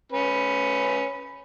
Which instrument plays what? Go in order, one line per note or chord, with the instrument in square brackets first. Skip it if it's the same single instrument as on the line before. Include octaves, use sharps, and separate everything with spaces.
[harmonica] C#4 B4